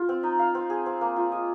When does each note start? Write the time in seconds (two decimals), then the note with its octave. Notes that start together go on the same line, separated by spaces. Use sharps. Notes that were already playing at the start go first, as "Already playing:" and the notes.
Already playing: F4
0.09 C4
0.23 D#4
0.39 F5
0.55 C4
0.70 G#4
0.86 C4
1.01 A#3
1.16 F4
1.32 D#5